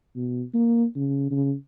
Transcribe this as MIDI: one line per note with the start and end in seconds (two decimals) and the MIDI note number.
0.16 0.43 47
0.54 0.84 58
0.95 1.31 49
1.31 1.53 49